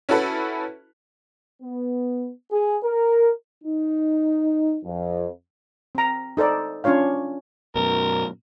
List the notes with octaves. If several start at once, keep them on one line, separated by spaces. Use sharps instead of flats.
C#4 E4 F#4 A4 B4
B3
G#4
A#4
D#4
F2
C4 A#5
D#4 A4 C5 D5
C#4 D4 F4 C#5 F5
F#2 B2 A#4